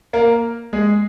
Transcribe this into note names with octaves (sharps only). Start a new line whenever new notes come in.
A#3 A#4
G#3 G#4